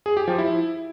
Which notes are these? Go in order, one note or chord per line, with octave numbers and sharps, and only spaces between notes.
G#4
G4
F3
E4